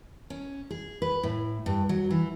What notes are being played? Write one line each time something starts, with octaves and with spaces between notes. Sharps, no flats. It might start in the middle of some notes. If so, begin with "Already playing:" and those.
C#4
G#4
B4
A2
G2
F#3
E3